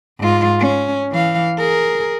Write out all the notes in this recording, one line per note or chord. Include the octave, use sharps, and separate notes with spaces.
G#2 F4
C#4
E3 F5
G#4 A#4